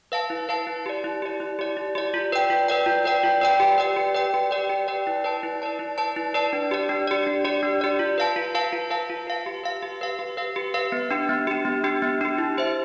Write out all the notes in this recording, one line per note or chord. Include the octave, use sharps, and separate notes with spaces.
B4 F5 A5
E4
B4 F5 A5
E4
G4 D5
E4
G4 D5
E4
G4 D5
E4
G4 D5
F4
B4 D5 G5
F4
B4 D5 G5
F4
B4 D5 G5
F4
B4 D5 G5
G4
B4 D5 G5
G4
B4 D5 G5
G4
B4 D5 G5
G4
B4 D5 G5
E4
B4 D5 A5
E4
B4 D5 A5
E4
B4 D5 A5
E4
B4 D5 A5
D4
G4 D5
D4
G4 D5
D4
G4 D5
D4
G4 D5
F4
B4 F5 A5
F4
B4 F5 A5
F4
B4 F5 A5
F4
B4 F5 A5
G4
B4 F5
G4
B4 F5
G4
B4 F5
G4
B4 F5
B3
D4 G4
B3
D4 G4
B3
D4 G4
B3
D4 G4
E4
G4 C5 E5